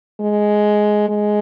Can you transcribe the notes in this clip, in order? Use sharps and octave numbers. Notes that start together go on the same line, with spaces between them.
G#3
G#3